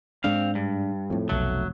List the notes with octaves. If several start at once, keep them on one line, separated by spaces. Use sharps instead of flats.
G#2 G#3 C4 D4 F5
G2
F2 A2
F1 B1 F#3 A3